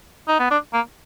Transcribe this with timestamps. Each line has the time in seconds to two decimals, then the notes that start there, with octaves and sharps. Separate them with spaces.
0.28 D#4
0.40 B3
0.51 D4
0.73 A#3